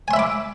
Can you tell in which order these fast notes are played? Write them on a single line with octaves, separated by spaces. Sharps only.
G#5 C6 E5 B5 D6